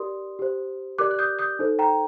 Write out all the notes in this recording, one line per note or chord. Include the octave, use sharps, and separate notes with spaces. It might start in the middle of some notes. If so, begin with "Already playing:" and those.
Already playing: G4 A#4 D5 C6 D#6
G4 C5
G4 A#4 D5 D6 F#6
F#6
D#6 G6
D#6 G6
D#4 A4 C5
G5 A#5